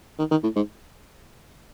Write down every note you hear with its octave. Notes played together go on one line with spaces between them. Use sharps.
D#3
D#3
A2
G#2